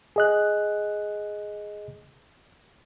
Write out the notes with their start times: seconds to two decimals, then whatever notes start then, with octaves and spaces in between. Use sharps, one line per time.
0.16 G#4 D#5 F#6